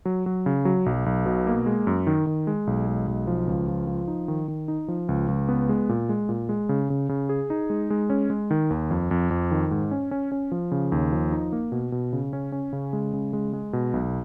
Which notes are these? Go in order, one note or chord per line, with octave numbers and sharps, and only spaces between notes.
F#3
F#3
C#3
F#3
B1
B1
B2
A#3
G#3
F#2
D#3
D#3
G#3
B1
G#3
B1
F3
C#2
F3
F3
D#4
D#3
D#3
D#4
F3
C#2
C#2
B3
G#3
A#2
G#3
A#2
G#3
C#3
C#3
C#3
G#4
D#4
G#3
G#3
C#4
G#3
D#3
D#2
F2
F2
F2
D#3
G#2
C#4
C#4
C#4
F3
C#3
D#2
F3
D#4
A#3
B2
B2
C#3
C#4
C#4
C#3
G#3
C#3
G#3
G#3
B2
B1